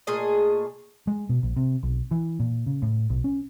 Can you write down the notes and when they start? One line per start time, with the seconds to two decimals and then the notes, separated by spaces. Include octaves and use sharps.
0.07 A#2 A3 G#4 D#5
1.07 G#3
1.29 B2
1.43 A#1
1.57 C3
1.83 B1
2.11 E3
2.40 A#2
2.66 C#3
2.82 A2
3.10 B1
3.24 C#4